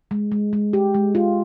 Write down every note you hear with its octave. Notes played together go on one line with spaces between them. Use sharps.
G#3
G#3
G#3
G4
G#3
F4